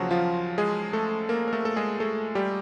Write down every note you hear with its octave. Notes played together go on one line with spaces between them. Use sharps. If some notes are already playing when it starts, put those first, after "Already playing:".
Already playing: D#2 C#3 F3 F#3 F#4
F3 F4
G#3 G#4
A3 A4
A#3 A#4
A#4
A3 A4
A4
G#3 G#4
A3 A4
G3 G4